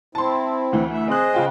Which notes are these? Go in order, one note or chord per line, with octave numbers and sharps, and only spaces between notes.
C4 E4 A5 C6
D2 E3
E5
C4 G#4 C5 D#5 F#6
C#3 F4 G5